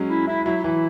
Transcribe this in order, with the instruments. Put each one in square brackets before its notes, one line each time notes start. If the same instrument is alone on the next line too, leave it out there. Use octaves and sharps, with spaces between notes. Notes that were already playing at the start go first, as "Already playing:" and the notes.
Already playing: [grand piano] F#3 G#3 [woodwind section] C#4
[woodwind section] E4
E4
[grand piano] F#3 [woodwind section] E4
[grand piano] E3 [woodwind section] E4